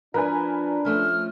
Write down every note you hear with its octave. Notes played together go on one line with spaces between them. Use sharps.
F3 D4 A#4 B4 G#5
F3 A3 C#4 F6